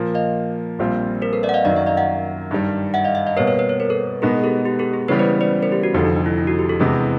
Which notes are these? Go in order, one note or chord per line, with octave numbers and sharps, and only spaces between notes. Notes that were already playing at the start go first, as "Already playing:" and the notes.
Already playing: A#2 F3 A#3
D#5 F5
A#1 A#2 G3 C4 F4
A#4 C5
A4 B4
D5 E5
F#5
D#5 F5
F#2 D#3 F#3 D5 E5
D5 E5
D#5 F5
E5 F#5
G2 D#3 G3
E5 F#5
D#5 F5
E5 F#5
D#5 F5
B2 G3 A#3 B4 C#5
B4 C#5
B4 C#5
B4 C#5
A#4 C5
A4 B4
B2 G#3 B3 D#4 G#4 A#4
G4 A4
G4
G4 A4
G#4
C#3 E3 G3 B3 B4 C#5
C5 D5
C5 D5
A#4 C5
G4
F#4
F1 F2 D3 F3 D#4
D#4
D#4
E4
E4
F#4
G4
G4 A4
E2 C3 E3 G#3 B3